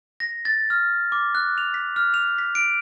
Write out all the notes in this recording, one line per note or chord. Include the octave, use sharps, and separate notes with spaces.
A#6
A6
F6
D6
F#6
F7
B6
F6
F7
B6
D7